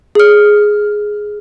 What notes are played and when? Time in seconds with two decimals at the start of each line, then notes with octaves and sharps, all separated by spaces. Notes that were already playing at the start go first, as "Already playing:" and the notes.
0.15 G#4 F6